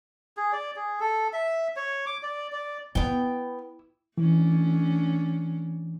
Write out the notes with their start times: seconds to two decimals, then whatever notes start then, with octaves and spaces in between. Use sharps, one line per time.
0.37 G#4
0.52 D5
0.76 G#4
1.00 A4
1.33 E5
1.76 C#5
2.06 D6
2.23 D5
2.52 D5
2.95 B3 E4 G5
4.18 E3 A3 C#4 D4